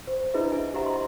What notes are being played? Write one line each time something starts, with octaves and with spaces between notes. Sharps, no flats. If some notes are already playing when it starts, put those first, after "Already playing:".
C5
D4 E4 G#4 B4 D#5 E5
E5 G#5
G4 C5 D#5 E5 F#5 A#5
A#5 C6